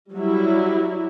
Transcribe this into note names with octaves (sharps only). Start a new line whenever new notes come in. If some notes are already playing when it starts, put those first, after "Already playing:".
F#3 G3 E4